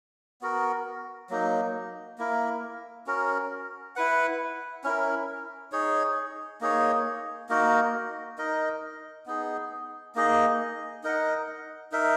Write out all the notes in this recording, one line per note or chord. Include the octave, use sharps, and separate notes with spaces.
B3 F#4 A#4
F#3 A#3 D#4
A#3 E4 A#4
C#4 F#4 A#4
E4 B4 F#5
C#4 E4 A#4
D#4 G#4 C#5
A#3 D#4 G#4 C#5
A#3 D#4 F#4 A#4
D#4 A#4 D#5
B3 D#4 G#4
A#3 D#4 G#4 D#5
D#4 A#4 D#5 F#5
D#4 A#4 E5